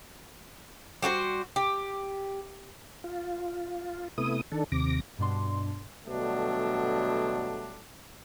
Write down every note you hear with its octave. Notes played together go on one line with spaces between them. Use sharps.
G3 F#4 A4 C5
G4
F4
C3 A3 B3 E4 D#6
D#3 D4 A4
D#2 C3 D6 A#6
G2 B2 D4 C6
B2 D3 F#3 G3 A3 D4